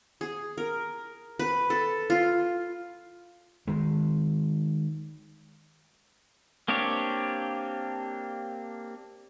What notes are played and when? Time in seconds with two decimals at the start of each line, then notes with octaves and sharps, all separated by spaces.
0.21 G#4
0.58 A#4
1.39 B4
1.70 A4
2.10 F4
3.67 D#3 G#3
6.68 A#3 C4 D4 G4 C#5